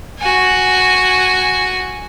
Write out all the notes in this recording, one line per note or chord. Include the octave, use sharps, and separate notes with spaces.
F#4 G#5